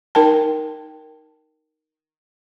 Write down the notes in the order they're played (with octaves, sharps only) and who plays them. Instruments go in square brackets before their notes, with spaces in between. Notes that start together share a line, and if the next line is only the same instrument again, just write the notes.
[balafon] D#4 A#4 G5 A5